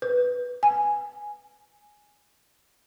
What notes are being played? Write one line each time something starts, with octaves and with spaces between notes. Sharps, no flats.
B4
G#5